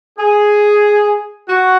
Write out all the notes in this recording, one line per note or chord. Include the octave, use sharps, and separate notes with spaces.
G#4
F#4